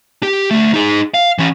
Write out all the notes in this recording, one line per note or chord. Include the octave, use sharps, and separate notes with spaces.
G4
D2 A3
D#4 G#4
F5
E3 C#4